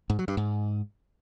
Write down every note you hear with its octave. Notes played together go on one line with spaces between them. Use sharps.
G#2
F#3
G2
G#2